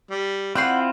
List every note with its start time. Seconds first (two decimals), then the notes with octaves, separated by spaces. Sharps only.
0.10 G3
0.55 C4 E4 F4 D5 F#5 G5 C6